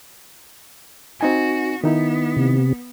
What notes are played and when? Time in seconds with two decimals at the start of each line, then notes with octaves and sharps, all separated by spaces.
1.21 C4 D#4 F#4 G#5
1.84 D#3 B3 D#4 E4
2.36 C3